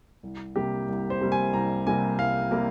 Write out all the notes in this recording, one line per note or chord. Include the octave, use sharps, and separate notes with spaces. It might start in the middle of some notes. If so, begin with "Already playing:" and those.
C2
C3 G3 A#3 G4
C2
C5
C3 G3 A#3
G#5
C2 A#5
C3 G3 A#3 G#5
C2 F5
C3 G3 A#3